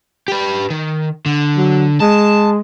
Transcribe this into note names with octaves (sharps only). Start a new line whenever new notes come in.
G4 B4
D#3
D3
F#3
G#3 A5